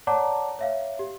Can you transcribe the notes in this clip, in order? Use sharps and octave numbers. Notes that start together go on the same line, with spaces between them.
C#5 D5 F#5 A5 A#5 D6
C#5 E5 F5
G4